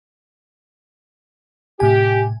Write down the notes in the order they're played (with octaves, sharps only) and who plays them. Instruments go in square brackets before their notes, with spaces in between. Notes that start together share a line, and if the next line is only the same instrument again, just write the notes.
[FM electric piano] A2 C3 G#5 [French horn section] G4